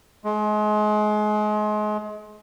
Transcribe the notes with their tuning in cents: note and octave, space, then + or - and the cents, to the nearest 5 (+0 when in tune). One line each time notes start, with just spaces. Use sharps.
G#3 +30